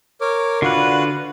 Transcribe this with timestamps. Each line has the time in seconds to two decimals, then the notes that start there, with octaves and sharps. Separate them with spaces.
0.21 A#4 C#5 D6
0.62 D3 F4 F#4 B4